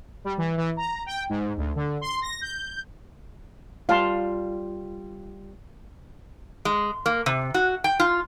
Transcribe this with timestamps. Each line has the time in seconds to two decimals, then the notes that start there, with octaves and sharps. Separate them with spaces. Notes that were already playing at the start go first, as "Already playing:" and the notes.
0.24 G3
0.38 E3
0.58 E3
0.77 A#5
1.06 G5
1.29 G#2
1.57 D2
1.75 D3
2.01 C6
2.22 A#6
2.41 G6
3.89 G3 F4 F5 A5 C6
6.65 G#3
7.06 A#3
7.26 C3
7.54 F#4
7.84 G5
8.00 F4